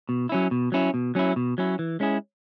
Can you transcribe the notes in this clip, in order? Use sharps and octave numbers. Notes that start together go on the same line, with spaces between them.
B2
F#3 C#4 E4
B2
F#3 C#4 E4
B2
F#3 C#4 E4
B2
F#3 C#4 E4
E3
G#3 C#4 E4 G#4